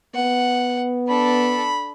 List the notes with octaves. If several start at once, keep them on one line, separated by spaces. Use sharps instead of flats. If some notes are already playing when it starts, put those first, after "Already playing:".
B3 F#5
D4 A4 B5